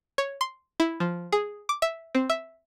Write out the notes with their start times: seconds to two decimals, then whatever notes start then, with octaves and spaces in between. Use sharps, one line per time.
0.18 C#5
0.41 C6
0.80 E4
1.00 F3
1.32 G#4
1.69 D6
1.82 E5
2.15 C4
2.30 E5